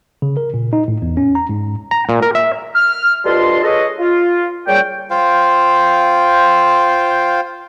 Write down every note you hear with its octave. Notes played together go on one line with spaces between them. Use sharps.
C#3
A#4
A#2
D#4
A2
E2
C#4
A#5
G#2
A#5
A#2
A#4
E5
F6
D2 G2 F4 D#5 A5 C6
G#4 A4 B4 C#5 D#5
F4
A#2 C#3 G3 C#5 G5
F4 C5 F5 G5